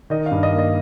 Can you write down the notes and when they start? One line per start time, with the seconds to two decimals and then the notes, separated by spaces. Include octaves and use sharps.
0.10 D#3 D#5
0.26 F5
0.31 G2
0.43 D#5
0.53 A#3
0.59 D#5